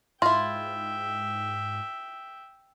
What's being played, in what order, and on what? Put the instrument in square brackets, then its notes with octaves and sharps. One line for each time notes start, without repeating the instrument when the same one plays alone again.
[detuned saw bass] G#2 [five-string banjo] E4 F4 [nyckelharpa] E5 G5 [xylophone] C6